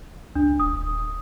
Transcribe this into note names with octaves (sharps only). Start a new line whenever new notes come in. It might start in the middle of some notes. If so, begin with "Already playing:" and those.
C#2 D4
D#1 D#6